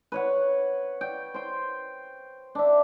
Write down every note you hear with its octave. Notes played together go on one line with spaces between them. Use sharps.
B4 C#5 F#5
G5
C5 G5
D4 E5